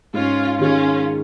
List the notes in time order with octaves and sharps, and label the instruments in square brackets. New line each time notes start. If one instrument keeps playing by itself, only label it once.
[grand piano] G#2 [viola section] C#4 F4
[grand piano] D#3 G#3 [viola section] C#4 F4